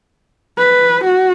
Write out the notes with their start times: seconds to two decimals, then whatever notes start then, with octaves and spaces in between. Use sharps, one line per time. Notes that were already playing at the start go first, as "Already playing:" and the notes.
0.58 B4
1.04 F#4